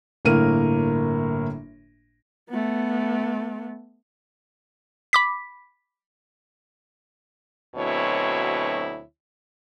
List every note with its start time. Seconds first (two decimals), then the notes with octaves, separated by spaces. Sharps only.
0.25 G1 A2 A#3 A#4 D#7
2.49 A3 B3
5.13 B5 D6 B6
7.75 D2 B2 F#3 C4 E4 C#5